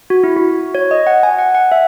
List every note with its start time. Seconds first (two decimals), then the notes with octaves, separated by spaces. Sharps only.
0.10 F#4
0.24 E4
0.36 F#4
0.75 C#5
0.91 D#5
1.07 F#5
1.23 G#5
1.39 F#5
1.55 F#5
1.72 E5